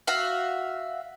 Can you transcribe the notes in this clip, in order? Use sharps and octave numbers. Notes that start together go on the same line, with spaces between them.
F#4 E5 F5